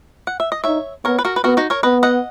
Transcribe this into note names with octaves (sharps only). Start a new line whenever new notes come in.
F#5
E5
D#5
D#4 C#5 E5
B3 A#4 C#5
B4
F#4 A#4
B4
B3 F#4 A#4
D#4 F#4
A#4 C#5
B3 B4 D#5
D#5 F#5